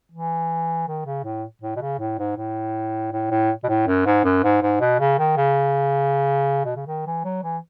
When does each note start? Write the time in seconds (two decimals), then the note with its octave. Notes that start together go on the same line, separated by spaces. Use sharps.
0.12 E3
0.88 D#3
1.06 C#3
1.24 A2
1.62 A2
1.76 B2
1.81 C#3
1.99 A2
2.19 G#2
2.37 A2
3.13 A2
3.31 A2
3.64 B2
3.69 A2
3.88 F#2
4.06 G#2
4.25 F#2
4.43 G#2
4.63 G#2
4.81 B2
5.00 C#3
5.19 D#3
5.37 C#3
6.65 B2
6.76 C#3
6.87 D#3
7.06 E3
7.25 F#3
7.43 E3